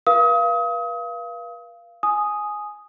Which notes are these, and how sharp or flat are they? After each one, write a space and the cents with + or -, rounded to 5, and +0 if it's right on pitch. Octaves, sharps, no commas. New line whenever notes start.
B4 -45 F5 -20 D#6 +35
G#5 +10 D#6 +0